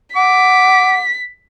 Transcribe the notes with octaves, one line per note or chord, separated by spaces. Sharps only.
F#5 D6 B6